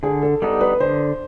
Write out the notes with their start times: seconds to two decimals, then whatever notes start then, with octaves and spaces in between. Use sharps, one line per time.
0.03 D3 G#4
0.23 A4
0.42 G3 B3 D#4 A4
0.61 B4
0.80 D3 C5